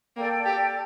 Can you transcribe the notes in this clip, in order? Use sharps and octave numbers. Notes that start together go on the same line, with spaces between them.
A#3 A4 D5 G5
G4